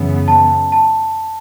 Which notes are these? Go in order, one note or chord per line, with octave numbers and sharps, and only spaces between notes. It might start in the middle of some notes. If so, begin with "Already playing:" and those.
Already playing: F#2 C#3 E3 B3
A5
A5